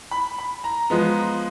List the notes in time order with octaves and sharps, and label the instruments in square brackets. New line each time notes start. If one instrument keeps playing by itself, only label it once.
[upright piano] B5
B5
A#5
F3 G#3 B3